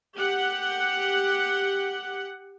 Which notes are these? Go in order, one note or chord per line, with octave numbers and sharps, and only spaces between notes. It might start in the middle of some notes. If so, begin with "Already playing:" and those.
G4 F#5